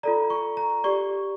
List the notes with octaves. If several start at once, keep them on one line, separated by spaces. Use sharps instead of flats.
F4 A4 D5 A#5
C#6
A#5
G4 D5 C#6